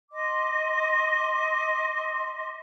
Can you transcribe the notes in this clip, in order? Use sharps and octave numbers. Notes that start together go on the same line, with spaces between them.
D#5 C6 D6